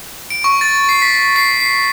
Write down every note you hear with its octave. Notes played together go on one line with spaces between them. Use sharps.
D7
C#6
A6
C7
B6
C7
C7